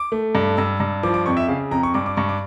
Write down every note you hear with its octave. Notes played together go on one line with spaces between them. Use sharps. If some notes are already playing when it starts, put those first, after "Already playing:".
Already playing: D6
A3
G2
G2 E6
G2
F3 D6
D6
F2 C#6
E5
C#3 F5
F2 A#5
C#6
G2 D6
D6
G2 C#6
D6